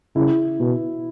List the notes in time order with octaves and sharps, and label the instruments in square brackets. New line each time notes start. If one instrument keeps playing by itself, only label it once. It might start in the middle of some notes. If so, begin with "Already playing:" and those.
[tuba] C#3 [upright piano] E4
[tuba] B2